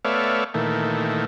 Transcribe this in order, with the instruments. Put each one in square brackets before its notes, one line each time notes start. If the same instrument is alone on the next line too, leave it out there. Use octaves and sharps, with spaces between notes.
[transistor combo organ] A3 B3 C#5 D5 E5 F5
A#2 D#3 E3 A3